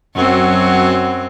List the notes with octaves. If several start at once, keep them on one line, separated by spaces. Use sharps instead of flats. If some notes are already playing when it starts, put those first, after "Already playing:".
F#2 F#3 C4